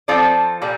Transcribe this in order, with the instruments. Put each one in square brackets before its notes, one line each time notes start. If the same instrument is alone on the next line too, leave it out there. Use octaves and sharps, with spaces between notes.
[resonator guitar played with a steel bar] F3 C4 F4 A4 D5
A#2 G3